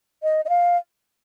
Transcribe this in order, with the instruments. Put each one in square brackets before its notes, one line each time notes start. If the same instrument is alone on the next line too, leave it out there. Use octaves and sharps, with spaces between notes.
[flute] D#5
D#5
F5